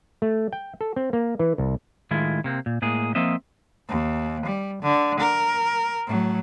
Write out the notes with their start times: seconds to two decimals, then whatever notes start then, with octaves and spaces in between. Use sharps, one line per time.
0.22 A3
0.53 G5
0.81 A4
0.96 C4
1.13 A#3
1.39 E3
1.58 C2
2.11 A2 D#3 G#3 E4 F4
2.44 C3 A#3 C4
2.66 A#2
2.82 A2 G#3 A#3 G#4
3.15 F3 A#3 C4 D#5 E5
3.89 D#2
4.46 G3
4.82 D3
5.20 A#4
6.07 A2 F#3